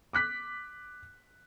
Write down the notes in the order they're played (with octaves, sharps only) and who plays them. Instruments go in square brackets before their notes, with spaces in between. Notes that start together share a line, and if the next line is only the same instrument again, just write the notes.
[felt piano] D6 F#6 B6